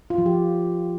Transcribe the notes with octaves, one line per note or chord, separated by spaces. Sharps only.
F4
F3
G4